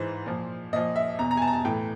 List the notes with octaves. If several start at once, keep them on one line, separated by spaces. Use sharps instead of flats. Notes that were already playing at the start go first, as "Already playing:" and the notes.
Already playing: G#2 E3 C5
A#2 F3
A#2 F3 D#5
E5
E2 B2 A#5
A#5
G#5
A5
A#5
A5
A2 E3 G5